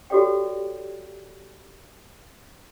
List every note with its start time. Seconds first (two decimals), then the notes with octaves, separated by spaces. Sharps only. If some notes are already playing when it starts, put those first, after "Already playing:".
0.10 F#4 G4 A4 C#5 D5 G5